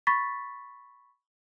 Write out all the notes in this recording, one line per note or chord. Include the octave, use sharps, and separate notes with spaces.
B5 C#6 A6 B6